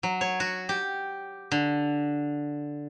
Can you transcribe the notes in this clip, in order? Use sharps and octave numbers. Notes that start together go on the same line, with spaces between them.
F#3
C#5
F#4
G4
D3